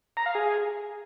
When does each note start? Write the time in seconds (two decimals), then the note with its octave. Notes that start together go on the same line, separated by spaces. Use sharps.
0.17 A#5
0.26 F5
0.35 G#4